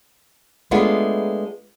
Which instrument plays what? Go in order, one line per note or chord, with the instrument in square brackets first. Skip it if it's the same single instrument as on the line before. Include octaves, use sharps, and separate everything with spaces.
[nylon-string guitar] G#3 A3 B3 D4 F4